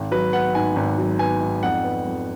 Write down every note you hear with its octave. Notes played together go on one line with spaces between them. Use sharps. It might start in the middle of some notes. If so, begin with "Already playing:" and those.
Already playing: G#1
F#3 B4
B3 F#5
G#2 G#5
G#1
F#3
B3 G#5
G#2
F2 F#5
B3
F2